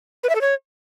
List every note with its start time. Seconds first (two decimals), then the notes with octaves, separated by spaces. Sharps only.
0.23 B4
0.29 E5
0.35 A4
0.41 C#5